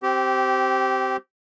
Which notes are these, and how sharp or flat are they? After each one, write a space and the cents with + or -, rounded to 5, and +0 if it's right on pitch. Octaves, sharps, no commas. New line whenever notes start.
C4 +0 G4 -20